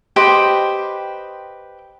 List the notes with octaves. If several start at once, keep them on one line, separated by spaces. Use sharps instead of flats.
G4 B4 C5 D#5